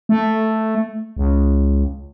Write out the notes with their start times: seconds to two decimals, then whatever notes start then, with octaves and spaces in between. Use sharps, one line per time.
0.09 A3
1.17 C#2